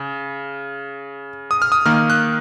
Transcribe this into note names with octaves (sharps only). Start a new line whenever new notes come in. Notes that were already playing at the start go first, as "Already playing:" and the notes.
Already playing: C#3
D#6
F6
D#6
D#3 A#3 F6
F#6